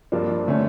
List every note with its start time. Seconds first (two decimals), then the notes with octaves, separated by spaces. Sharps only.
0.12 G2 F3 A#3 D4 F4
0.48 D3 A3 C#4